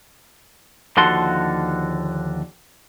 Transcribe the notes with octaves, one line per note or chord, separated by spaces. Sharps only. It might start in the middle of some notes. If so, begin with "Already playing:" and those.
D#2 D3 F3 F#4 A4 C6